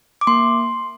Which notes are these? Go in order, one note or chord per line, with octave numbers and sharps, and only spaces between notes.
D6
A#3 C6